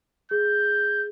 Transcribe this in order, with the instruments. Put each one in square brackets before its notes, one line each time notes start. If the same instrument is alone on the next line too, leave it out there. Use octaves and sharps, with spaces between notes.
[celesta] G#4 [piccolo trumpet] G6